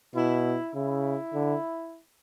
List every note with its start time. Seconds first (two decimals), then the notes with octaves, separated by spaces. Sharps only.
0.15 B2 E4
0.74 C#3 E4
1.34 D3